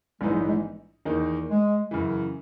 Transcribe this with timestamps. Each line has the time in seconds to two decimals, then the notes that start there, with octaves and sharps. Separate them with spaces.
0.21 A#1 G#2 E3 G#3 B3 D#4
0.34 F#3
0.47 G#3
1.05 E2 D#3 A#3 D#4
1.49 G#3
1.91 F#2 C#3 E3